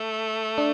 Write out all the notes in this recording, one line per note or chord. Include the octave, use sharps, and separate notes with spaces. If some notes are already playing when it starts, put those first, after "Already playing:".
Already playing: A3
D4